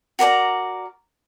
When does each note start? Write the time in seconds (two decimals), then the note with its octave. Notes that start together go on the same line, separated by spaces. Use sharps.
0.19 F#4 A#4 D5 A#5